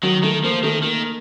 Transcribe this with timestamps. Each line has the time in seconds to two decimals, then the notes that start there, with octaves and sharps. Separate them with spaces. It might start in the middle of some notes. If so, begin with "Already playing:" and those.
0.03 D#3 F#3
0.23 D#3 A3
0.43 F3 A#3
0.63 D#3 A3
0.83 D#3 A#3